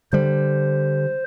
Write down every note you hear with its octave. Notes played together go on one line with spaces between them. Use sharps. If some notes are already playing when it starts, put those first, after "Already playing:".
D3 G3 C5